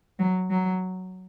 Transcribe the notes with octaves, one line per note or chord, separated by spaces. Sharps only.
F#3
F#3